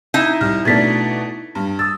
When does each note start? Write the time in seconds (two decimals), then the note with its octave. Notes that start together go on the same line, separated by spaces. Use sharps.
0.14 D#4 E4
0.41 C2 F6
0.65 B2 A3 D4 G#6 A6 B6
1.55 G2
1.79 D#6 E6 A6